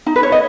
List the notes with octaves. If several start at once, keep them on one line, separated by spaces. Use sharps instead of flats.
D#4
B4
C#5
D#5